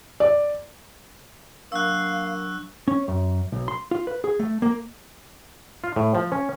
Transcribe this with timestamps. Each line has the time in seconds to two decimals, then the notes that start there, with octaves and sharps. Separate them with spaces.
0.20 D5
1.72 F#3 A#3 D4 F5 C#6 E6 F#6
2.88 C#4
3.08 F#2
3.52 B1
3.68 C6
3.91 F4
4.07 B4
4.24 G#4
4.39 A3
4.62 A#3
5.84 F4
5.96 A2
6.15 F3
6.32 C#4